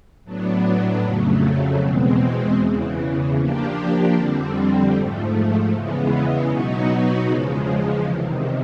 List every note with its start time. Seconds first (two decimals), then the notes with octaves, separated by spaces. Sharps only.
0.24 A2 F#3 B3 D4
1.02 F2 C#3 F#3 A3
1.81 E2 B2 G#3 C4
2.58 E2 C#3 E3
3.37 F3 A#3 D4 G4
4.14 F2 D3 G3 C4
4.93 G#2 F3 A3
5.71 E2 C#3 E3 G#3 B3
6.48 B2 F#3 B3 D#4 F#4
7.26 E2 C#3 F3 G#3
8.04 E2 C3 D#3